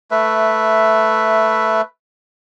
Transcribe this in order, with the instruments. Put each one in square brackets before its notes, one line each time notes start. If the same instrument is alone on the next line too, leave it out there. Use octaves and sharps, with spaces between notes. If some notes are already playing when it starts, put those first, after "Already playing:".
[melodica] A3 B4 E5